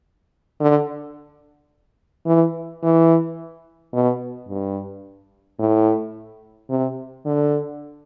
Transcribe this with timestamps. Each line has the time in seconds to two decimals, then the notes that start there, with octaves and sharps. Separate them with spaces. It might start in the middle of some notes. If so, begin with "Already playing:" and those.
0.61 D3
2.27 E3
2.83 E3
3.94 B2
4.49 G2
5.59 A2
6.70 C3
7.26 D3